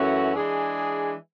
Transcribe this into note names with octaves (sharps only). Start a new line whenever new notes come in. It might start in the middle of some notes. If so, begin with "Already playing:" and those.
Already playing: F#2 E3 A3 C#4 F#4
E3 G#3 D4 G#4